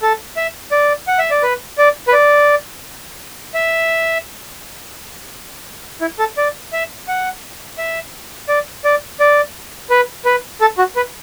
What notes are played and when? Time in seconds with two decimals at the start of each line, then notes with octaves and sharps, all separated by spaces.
0.02 A4
0.37 E5
0.71 D5
1.07 F#5
1.19 E5
1.31 D5
1.43 B4
1.78 D5
2.08 B4
2.13 D5
3.54 E5
6.01 E4
6.19 A4
6.38 D5
6.73 E5
7.08 F#5
7.78 E5
8.48 D5
8.85 D5
9.20 D5
9.90 B4
10.25 B4
10.61 A4
10.78 F#4
10.96 B4